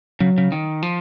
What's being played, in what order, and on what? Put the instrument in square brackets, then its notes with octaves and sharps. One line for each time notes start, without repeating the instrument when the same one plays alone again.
[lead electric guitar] C#3 [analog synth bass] F#3
[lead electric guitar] C#3
D#3
F3